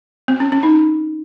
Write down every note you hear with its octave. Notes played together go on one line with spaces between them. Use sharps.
C4
C#4
C#4
D#4